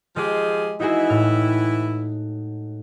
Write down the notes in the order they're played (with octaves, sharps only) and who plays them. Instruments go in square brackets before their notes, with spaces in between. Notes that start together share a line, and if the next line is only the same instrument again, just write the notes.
[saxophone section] F3 G4 G#4 [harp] G#3
[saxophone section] E3 E4 [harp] D#4 F#4 G#4
[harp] A2 F6